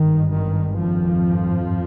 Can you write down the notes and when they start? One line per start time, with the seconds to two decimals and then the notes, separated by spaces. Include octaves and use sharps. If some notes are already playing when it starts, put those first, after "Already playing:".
Already playing: G#1 G2 D#3
0.32 D#3
0.78 F2 F3